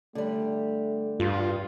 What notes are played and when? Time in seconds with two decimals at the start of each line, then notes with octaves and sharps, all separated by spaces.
0.15 D3 G3 A3
1.20 G2 F4